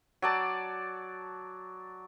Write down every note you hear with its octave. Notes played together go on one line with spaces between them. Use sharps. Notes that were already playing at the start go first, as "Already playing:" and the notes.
F#3 D5 A5